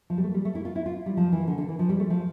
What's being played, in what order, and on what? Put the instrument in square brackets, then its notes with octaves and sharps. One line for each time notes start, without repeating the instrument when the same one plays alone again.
[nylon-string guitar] F3
G3
A3
G3
A3
E4
F4
E4
F4
G3
F3
E3
D3
D3
E3
F3
G3
A3
F3